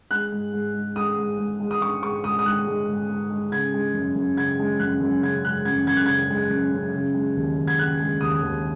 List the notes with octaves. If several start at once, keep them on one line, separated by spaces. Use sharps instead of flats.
G#3 F#6
G#2
G#2
G#3
G#3 D#6
G#2
G#2
G#3
D#6
G#3 C#6
G#2 C#6
G#2 D#6
D#6
G#3 F#6
G#3
G#2
G#2
G#3
C#3 G#6
G#3
F#2
F#2
C#3 G#6
G#3
F#2 F#6
F#2
C#3 G#6
G#3 F#6
F#2 G#6
F#2 G#6
F#6
C#3 G#6
G#3
F#2
F#2
C#3
G#3
D#2
D#2
G#6
C#3 F#6
G#3
D#2 D#6
D#2